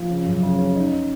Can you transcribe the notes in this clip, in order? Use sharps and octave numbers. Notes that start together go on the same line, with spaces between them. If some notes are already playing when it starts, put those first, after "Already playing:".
Already playing: F3
C#3
F#2
C#3
C#4
D#4